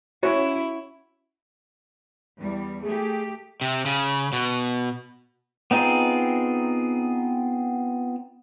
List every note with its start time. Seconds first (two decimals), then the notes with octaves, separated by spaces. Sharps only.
0.23 C#4 E4 F#4 C#5
2.37 E2 G3
2.83 A3 G4 G#4
3.61 C3
3.86 C#3
4.33 B2
5.71 B3 C4 D#4 F4 G#4